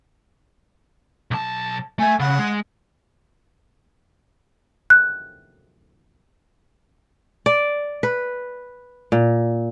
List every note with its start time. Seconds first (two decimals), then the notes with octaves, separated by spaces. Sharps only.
1.31 B1 A5
1.99 A3 E5 G#5
2.20 C#3 F#5
2.39 G#3
4.90 F#6
7.46 D5
8.03 B4
9.12 A#2